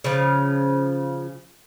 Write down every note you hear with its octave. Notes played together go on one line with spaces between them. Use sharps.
C#3 F3